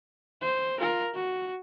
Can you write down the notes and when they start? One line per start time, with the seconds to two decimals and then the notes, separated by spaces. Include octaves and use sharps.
0.41 C5
0.79 F4 A#4
1.14 F#4